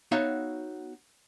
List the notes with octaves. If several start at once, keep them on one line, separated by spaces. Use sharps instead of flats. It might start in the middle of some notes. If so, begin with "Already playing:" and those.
B3 D#4 F#4 C#5 E5 F5